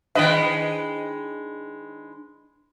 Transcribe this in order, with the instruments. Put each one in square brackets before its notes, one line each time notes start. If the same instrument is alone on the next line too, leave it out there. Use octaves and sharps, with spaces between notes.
[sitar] D#3 G#3 B4 [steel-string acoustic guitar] D4 G5 [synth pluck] D#5 D7